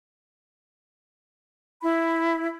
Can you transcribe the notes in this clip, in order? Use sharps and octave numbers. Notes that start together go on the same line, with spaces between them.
E4 B5